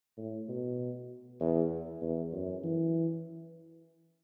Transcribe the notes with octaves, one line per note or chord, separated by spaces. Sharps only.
A2
B2
E2
E2
F#2
E3